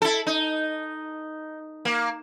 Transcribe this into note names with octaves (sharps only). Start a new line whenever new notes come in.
E4 A4
D#4
A#3